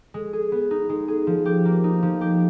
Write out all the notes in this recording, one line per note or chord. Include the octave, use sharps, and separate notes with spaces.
G#3
G#4
B3
D#4
G#3
G#4
F3
G4
A#3
D#4
F3
G4